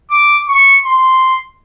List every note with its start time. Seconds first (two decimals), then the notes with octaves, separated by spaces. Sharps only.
0.11 D6
0.48 C#6
0.85 C6